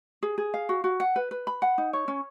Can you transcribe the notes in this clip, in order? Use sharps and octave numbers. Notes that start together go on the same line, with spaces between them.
G#4
G#4
F5
F#4
F#4
F#5
B4
B4
B5
F#5
D#4
C#5
C#4